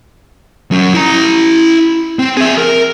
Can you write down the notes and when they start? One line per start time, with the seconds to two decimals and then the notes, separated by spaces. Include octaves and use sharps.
0.71 F#3 C#4
0.94 E4 A#5
2.19 C4
2.37 G#4 E5
2.58 A#4